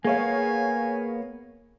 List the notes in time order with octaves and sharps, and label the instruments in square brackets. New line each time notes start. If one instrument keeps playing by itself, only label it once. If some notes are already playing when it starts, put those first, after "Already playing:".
[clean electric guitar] A#3 B3 [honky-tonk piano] G#4 C#5 F5 [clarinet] G#5